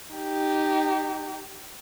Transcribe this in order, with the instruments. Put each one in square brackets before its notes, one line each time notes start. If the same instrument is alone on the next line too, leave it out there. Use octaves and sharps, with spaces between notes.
[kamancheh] D#4 G4